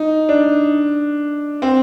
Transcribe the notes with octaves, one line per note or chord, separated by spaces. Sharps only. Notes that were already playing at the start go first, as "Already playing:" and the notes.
Already playing: D#4
D4
C4